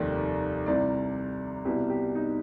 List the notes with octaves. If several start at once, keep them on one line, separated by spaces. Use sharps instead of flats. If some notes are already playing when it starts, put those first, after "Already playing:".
Already playing: F1 D#2 D#3 G3 D5
C2 C3 G3 D5
C2 B2 G3 G4
G4
D#4